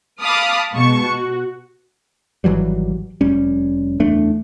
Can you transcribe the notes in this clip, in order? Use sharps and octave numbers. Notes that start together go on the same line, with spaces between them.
F5 A5 B5 D6 D#6 F6
B2 G#3 A5 C#6
F#4
G#1 E3 F#3 G3
F1 G3 C#4
F#1 E2 A3 D4